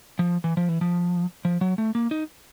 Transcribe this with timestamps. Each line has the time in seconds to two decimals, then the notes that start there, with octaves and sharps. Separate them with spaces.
0.19 F3
0.44 E3
0.57 F3
0.69 E3
0.81 F3
1.45 F3
1.61 F#3
1.78 A3
1.95 A#3
2.11 D#4